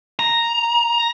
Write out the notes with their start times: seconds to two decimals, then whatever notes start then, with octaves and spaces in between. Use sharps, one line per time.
0.19 A#5